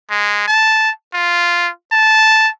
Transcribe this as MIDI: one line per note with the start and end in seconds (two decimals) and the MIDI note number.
0.10 0.45 56
0.48 0.90 81
1.14 1.69 65
1.92 2.49 81